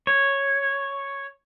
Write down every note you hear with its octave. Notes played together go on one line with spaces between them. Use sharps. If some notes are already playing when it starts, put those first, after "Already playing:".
C#5